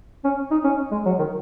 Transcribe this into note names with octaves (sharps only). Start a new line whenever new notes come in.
C#4
D#4
C#4
G#3
F#3
D#3